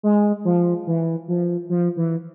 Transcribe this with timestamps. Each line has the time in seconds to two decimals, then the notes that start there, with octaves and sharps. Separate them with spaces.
0.03 G#3
0.45 F3
0.87 E3
1.28 F3
1.69 F3
1.97 E3